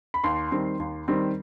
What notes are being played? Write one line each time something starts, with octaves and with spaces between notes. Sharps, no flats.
B5
D#2 C6
D#3 G3 C4
D#2
D#3 G3 C4